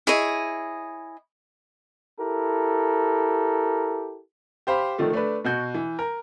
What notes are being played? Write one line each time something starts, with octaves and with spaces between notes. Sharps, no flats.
E4 G#4 C#5 D#5
E4 G4 A4 A#4
G4 C5 F5 B5
D3 D#3 F3 A3
A3 D4 B4
B2 F#4 G6
E3
A#4